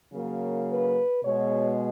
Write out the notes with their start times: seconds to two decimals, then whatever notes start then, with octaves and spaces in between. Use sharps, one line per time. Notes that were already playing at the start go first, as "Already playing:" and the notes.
0.12 C#3 F#3 A#3 A#4
0.68 B4
1.23 B2 G#3 C#5